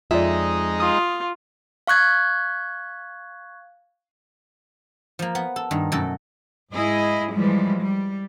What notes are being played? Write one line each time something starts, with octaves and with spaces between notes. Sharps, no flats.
F2 G#3 D#4 F4 D5 E5
F4 D#6
F5 C#6 F#6 G#6
F3 A#3
B3
A4
G2 D#3
F#2 B2 A3 A4
G#2 E4 G#4 D#5
E3 F3 G3 G#3
G3